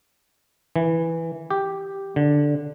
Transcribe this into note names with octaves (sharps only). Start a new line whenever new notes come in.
E3
G4
D3